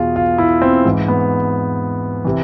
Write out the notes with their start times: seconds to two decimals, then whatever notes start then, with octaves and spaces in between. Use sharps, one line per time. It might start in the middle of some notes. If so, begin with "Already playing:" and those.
Already playing: E2 B2 F4 G#4
0.16 F4
0.38 E4
0.62 C4
0.85 G#2 E3
1.08 B3
2.25 C3 E3